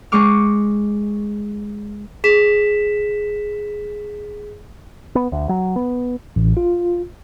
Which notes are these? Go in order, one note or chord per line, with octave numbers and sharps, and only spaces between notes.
G#3 C#6 D6 F6
G#4 B6 E7
B3
D2
F#3
B3
A1
F4